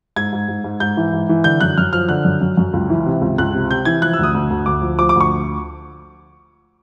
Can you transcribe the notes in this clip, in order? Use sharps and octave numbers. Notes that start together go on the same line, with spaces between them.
G#2 G#6
G#2
G#2
G#2
G#2 G6
E3
G#2
E3
D3 G6
F#2 F#6
F#2 F6
F3 F6
D3 F#6
F#2
F#2
F#2
C#2
E3
C3
C#2
C#2 F#6
C3
C3 G6
E3 G#6
F3 F#6
E6
D2 D#6
D2
D2
D2 D6
F3
F3 D6
D6
D2
C#6